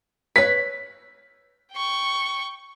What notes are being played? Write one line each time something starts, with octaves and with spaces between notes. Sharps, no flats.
B4 C#5 B6
G5 C#6